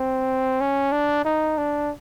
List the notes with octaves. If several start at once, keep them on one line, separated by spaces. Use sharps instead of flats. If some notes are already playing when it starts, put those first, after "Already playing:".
Already playing: C4
C#4
D4
D#4
D4